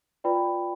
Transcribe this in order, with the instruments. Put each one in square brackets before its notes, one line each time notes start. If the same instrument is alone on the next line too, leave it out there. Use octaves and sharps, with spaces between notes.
[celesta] F4 B4 D5 G5 B5